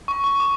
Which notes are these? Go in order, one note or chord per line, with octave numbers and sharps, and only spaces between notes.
C#6
C#6
D6